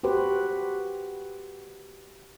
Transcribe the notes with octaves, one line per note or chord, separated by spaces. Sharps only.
F#4 G4 B4 C5